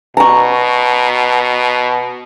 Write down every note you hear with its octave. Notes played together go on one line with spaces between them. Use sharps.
B2 A#5 C#6